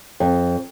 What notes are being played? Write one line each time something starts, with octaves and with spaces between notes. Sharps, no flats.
F2